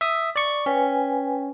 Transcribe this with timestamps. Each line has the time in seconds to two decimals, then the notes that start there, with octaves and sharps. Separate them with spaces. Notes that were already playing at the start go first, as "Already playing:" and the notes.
0.01 E5 D#6
0.36 D5 C#6
0.66 C#4 B4 G5 G#5